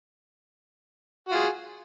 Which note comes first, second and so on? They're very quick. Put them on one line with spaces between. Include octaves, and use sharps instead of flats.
F#4 F4 G#4